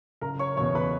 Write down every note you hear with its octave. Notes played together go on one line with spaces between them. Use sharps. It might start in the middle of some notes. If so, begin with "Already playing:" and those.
F#1 A#4 A#5
C#5 C#6
E2 B2 C#5 C#6
B4 B5